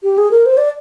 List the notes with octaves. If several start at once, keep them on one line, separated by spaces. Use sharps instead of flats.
G4
G#4
A#4
C5
D5